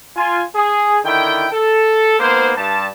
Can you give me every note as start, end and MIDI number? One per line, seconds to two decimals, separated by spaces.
0.17 0.43 65
0.17 0.43 80
0.55 0.98 68
1.04 1.46 50
1.04 1.46 51
1.04 1.46 64
1.04 1.46 79
1.52 2.18 69
2.20 2.51 44
2.20 2.51 58
2.20 2.51 59
2.20 2.51 72
2.56 2.88 43
2.56 2.88 81